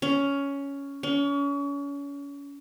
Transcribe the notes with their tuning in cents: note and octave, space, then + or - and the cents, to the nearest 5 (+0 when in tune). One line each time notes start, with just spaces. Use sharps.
C#4 +10
C#4 +35